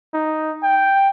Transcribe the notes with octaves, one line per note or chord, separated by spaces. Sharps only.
D#4
G5